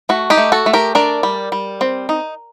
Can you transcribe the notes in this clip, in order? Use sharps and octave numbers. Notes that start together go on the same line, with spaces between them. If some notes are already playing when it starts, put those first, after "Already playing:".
A3 F#4
D#4 G4
A3
F#4 A4
A3
G4 A#4
D4 A#4 D5
G3
G3
C4
D#4